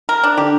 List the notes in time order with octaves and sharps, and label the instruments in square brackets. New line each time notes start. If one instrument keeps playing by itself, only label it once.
[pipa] A#4
D4
[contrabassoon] D3 [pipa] G4